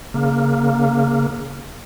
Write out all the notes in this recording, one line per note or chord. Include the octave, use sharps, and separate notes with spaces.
C#3 A#3